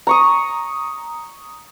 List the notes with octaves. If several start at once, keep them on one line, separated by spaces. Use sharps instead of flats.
A#5 C#6 D#6